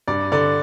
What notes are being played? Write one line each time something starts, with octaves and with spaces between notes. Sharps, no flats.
G2 D5
D3 D5